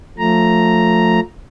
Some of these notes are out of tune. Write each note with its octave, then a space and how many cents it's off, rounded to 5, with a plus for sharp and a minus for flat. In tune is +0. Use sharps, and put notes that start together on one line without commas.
F3 +20 A3 +10 A#5 +0